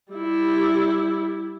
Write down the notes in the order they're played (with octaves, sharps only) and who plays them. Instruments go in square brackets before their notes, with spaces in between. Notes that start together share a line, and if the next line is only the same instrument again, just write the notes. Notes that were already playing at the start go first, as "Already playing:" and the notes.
[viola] G3 E4